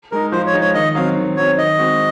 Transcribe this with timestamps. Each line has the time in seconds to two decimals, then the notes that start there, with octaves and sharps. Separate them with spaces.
0.12 G#3 D#4 A#4
0.32 F3 C5
0.46 C#5
0.53 G#3 D#4
0.61 C#5
0.74 D#3 D#5
0.95 F#3 C4 F5
1.17 D#3
1.37 F#3 C4 C#5
1.57 D#3 D#5
1.78 G#3 C4 F#4